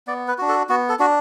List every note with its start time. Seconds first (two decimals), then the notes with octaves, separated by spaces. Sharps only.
0.07 B3 D5
0.28 B4
0.38 D4 F#4
0.49 A4
0.69 B3 F#4
0.89 A4
0.99 D4 F#4